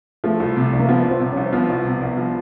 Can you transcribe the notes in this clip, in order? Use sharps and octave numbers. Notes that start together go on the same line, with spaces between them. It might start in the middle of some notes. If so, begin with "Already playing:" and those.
F3 A3
C2
C3
C2
A#3
F3 B3
C2
C4
C3
C#4
C2
C4
F3 B3
C2
C3
C2
F3